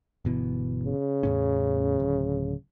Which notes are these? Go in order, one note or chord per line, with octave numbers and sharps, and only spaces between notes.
G1 B2 E3
C#3
E2 A2 C#4
D1